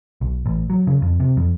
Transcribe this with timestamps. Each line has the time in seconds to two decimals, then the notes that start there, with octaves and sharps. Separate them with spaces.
0.21 B1
0.46 A1
0.70 F#3
0.87 C#3
1.02 F2
1.20 C3
1.37 F2